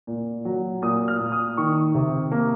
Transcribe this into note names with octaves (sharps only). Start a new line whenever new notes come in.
A#2
F#3
A#2 D#6
F6
A#2
D#6
D#3 C#6
C3
A#3